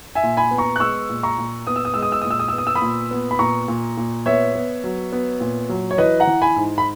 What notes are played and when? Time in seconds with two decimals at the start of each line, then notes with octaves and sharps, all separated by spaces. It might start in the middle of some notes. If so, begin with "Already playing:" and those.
0.15 E5 G#5
0.23 A#2
0.37 G#5 B5
0.51 B3
0.58 A#5 C#6
0.76 F#6
0.80 G#3 C#6 E6
1.09 A#2
1.23 A#5 C#6
1.38 A#2
1.67 B3 D#6
1.76 E6
1.85 D#6
1.94 G#3 E6
2.02 D#6
2.12 E6
2.21 A#2 D#6
2.30 E6
2.40 D#6
2.48 E6
2.53 B3
2.58 D#6
2.67 E6
2.75 B5 D#6
2.82 A#2
3.11 B3
3.31 B5
3.39 A#2 A#5 C#6
3.68 A#2
3.97 A#2
4.26 B3 C#5 E5
4.55 B3
4.84 F#3
5.12 B3
5.41 A#2
5.69 F#3
5.91 C#5
5.98 E3 B4 D#5
6.20 F#5 A#5
6.27 E3
6.42 G#5 B5
6.56 G#2
6.78 B5